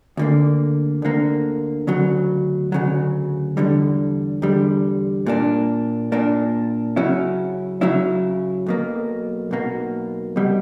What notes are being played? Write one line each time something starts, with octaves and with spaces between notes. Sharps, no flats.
D2 D3 A#3
D2 D3 A#3
D2 C#3 F#3
D2 C#3 F#3
E2 D3 G3
E2 D3 G3
A#2 A#3 D4
A#2 A#3 D4
C#3 F#3 C#4 E4
C#3 F#3 C#4 E4
B1 B2 A#3
B1 B2 A#3
C#2 B2 G3